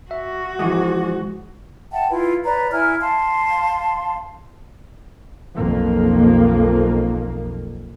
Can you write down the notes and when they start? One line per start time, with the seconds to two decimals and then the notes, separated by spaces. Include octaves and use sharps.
0.11 F#4 E5
0.59 G#2 E3 F3 G#3 F#5 D6 D#6
1.91 E5 F#5 G5 A5
2.09 E4 F4 B4
2.45 B4 C#5 D5 A#5
2.71 E4 E5 G#5 F6
3.00 F5 A5 C6
5.54 B1 F2 F3 A#3